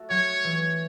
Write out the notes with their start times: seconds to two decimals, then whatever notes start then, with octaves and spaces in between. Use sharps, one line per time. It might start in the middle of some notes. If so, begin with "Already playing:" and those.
Already playing: A3 F#4
0.10 F#3 C#5
0.44 E3